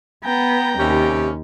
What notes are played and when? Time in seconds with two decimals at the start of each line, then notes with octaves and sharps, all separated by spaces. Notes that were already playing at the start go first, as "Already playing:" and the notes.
0.24 B3 G5 A#5
0.79 D#2 C3 C#4 G4